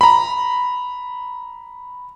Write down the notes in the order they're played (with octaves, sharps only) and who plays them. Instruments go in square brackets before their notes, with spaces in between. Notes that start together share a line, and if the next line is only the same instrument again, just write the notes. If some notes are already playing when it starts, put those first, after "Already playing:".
[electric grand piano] A#5 B5